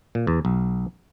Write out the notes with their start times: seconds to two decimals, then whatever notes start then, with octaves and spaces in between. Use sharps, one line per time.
0.15 A#2
0.27 E2
0.45 B1